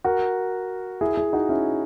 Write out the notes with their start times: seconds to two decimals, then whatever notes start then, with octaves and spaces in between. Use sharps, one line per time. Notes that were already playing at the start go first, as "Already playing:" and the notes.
0.04 F#4 A#4
1.01 E4 G#4
1.17 E4 G#4
1.33 D#4 F#4
1.49 C#4 E4